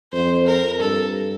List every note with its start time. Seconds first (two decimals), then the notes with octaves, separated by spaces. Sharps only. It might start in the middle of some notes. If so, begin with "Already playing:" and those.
0.13 F2 C5
0.47 A#4
0.80 G2 A4